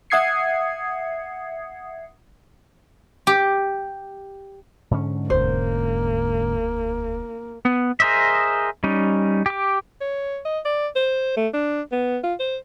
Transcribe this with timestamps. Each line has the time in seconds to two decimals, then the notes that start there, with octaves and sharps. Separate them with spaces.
0.10 E5 F#5 D#6 G#6 C7 C#7
3.27 G4
4.91 G#2 D3 C#4
5.30 E1 D2 A#3 C5
7.65 B3
8.00 G#4 A#4 C5 D#5 E5
8.84 G3 C#4 D#4
9.46 G4 D6
10.01 C#5
10.45 D#5
10.65 D5
10.96 C5
11.37 A3
11.54 D4
11.92 B3
12.23 F4
12.40 C5